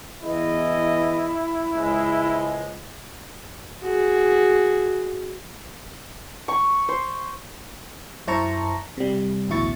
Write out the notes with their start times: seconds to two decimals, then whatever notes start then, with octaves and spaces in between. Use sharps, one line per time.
0.23 E2 E4 D#5
1.74 C#2 F3 G#3
3.82 F#4 G#4
6.48 C#6
6.89 C5
8.27 F#2 E4 C5 A5 A#5 C#6
8.97 C3 G3
9.49 A1 D2 B2 E4 C#6 A6